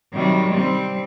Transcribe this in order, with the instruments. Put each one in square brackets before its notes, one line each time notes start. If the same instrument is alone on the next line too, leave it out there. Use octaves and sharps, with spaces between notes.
[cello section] C3 D#3 F#3 G3
G3 C4